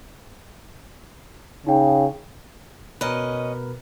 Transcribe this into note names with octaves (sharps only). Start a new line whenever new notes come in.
C#3 D#4 G5
B2 C#4 A#4 B4 D#5